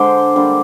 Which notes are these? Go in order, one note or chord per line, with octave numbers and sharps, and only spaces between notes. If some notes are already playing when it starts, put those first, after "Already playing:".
Already playing: D3 G#3 C5 D5
D3 G3 A#3